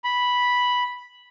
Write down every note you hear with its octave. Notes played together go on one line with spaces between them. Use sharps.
B5